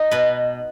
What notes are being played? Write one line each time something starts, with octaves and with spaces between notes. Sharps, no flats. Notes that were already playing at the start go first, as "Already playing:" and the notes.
Already playing: D#4
B2 B4